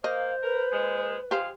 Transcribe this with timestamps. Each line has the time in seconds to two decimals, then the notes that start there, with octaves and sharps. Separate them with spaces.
0.04 A#3 C5 D#5 F5
0.43 A#4 B4
0.72 A#2 G#3
1.31 F3 G#3 G4 C5 F5